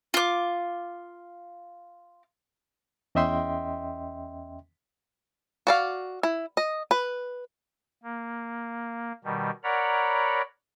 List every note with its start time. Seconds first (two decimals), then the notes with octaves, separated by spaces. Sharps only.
0.14 F4 D6
3.15 E2 C#4 D#5 E5 G5 C6
5.67 F#4 D5 F5
6.23 E4
6.57 D#5
6.91 B4
8.03 A#3
9.24 B2 D#3 G3
9.64 A#4 C#5 D5 F#5 A#5 B5